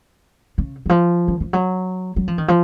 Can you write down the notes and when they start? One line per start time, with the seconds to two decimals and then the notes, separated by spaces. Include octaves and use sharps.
0.58 C#3
0.86 D#3
0.89 F3
1.28 D#3
1.40 F3
1.53 F#3
2.16 F#3
2.28 F3
2.38 D#3
2.48 F3